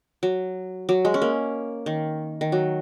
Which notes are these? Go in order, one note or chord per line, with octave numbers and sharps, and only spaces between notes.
F#3
F#3
G#3
C#4
A#3
D#3
D#3
F#3